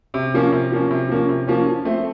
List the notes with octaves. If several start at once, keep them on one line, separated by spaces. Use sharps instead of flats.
C3
F3 A#3 C#4
C3
F3 A#3 C#4
C3
F3 A#3 C#4
C3
F3 A#3 C#4
F3
A3 C4